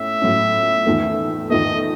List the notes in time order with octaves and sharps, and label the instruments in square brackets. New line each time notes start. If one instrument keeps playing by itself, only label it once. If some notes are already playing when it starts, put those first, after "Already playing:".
Already playing: [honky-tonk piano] A2 C#4 [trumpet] E5
[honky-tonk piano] A2 F#3 C#4
E2 D#3 A3
[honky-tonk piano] E2 D#3 A3 [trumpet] D#5